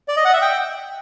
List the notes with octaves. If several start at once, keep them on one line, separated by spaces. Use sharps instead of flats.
D5
D#5
F#5
E5
G5